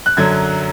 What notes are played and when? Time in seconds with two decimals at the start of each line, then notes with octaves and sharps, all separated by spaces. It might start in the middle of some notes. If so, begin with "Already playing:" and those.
0.06 F#6
0.17 F#2 D3 F#3 G#6